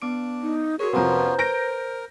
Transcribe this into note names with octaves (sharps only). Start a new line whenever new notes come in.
B3 D4 D6 D7
D#4
F#4 G#4 A#4 C#5
F2 C3 B3 C#4 F4 B4 C5 A#5
A#4 G6 A#6 D7